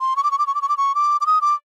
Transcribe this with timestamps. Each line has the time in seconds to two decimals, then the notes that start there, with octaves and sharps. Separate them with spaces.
0.01 C6
0.16 C#6
0.24 D6
0.31 C#6
0.39 D6
0.47 C#6
0.55 D6
0.62 C#6
0.69 D6
0.77 C#6
0.95 D6
1.21 D6
1.26 D#6
1.41 D6